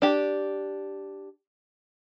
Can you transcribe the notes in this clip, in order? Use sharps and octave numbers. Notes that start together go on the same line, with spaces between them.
D4 G4